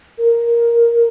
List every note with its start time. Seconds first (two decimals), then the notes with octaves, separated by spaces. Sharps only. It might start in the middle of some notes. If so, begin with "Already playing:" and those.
0.18 A#4